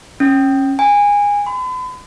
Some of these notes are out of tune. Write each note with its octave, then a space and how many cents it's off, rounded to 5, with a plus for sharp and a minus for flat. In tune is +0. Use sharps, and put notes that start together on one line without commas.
C#4 -20
G#5 -20
B5 +45